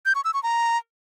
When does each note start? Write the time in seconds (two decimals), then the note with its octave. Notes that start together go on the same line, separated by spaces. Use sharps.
0.06 G6
0.15 C#6
0.25 E6
0.34 C#6
0.43 A#5